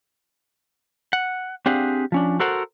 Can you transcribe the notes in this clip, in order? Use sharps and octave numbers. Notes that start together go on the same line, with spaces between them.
F#5
C4 D4 G4 G#4 F5 F#5
F3 C#4 D4
F#4 A4 A#4 C5 F#5